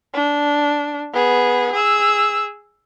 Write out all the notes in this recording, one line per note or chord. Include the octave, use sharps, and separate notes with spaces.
D4
B3 G#4
G#4 E6